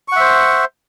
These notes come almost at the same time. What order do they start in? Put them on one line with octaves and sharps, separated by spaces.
C#6 F#5 E5 C5